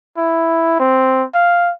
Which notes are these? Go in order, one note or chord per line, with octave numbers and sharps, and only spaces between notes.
E4
C4
F5